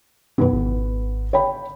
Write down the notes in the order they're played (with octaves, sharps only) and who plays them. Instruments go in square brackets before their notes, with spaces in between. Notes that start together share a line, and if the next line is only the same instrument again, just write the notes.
[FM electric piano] F#2 B2 D#3 [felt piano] B3 B4
[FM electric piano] G#1
[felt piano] C#5 G5 B5